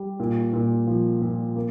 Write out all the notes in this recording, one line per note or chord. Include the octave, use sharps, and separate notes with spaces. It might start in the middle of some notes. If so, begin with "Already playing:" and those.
Already playing: G3
A#2
A#2
F3
A#2
A#3